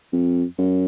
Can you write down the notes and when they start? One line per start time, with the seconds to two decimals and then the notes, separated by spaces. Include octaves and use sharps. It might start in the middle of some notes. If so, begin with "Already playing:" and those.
0.13 F2
0.58 F#2